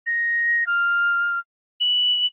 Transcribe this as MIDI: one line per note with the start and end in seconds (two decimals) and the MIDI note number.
0.06 0.66 94
0.67 1.39 89
1.80 2.26 102